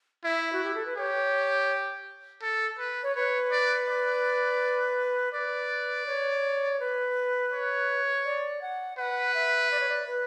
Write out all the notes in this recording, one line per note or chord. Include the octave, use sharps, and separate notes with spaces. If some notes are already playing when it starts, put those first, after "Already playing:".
E4 E5
F#4
G4
A4
B4
G4 C#5
A4
B4
C#5
B4 C#5
D5
D5
B4 D5
C#5
B4
C#5
D5
F#5
B4 F#5
E5
D5
C#5
D5
B4